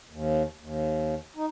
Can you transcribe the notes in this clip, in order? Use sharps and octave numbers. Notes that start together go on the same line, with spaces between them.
D#2
D#2
D#4